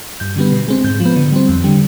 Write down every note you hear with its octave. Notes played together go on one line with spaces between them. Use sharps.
G2 G6
D3 G3 B3
B2
G#3 C4
G#2 G6
F3
B3
D3
G3 C4
F2
D3 G3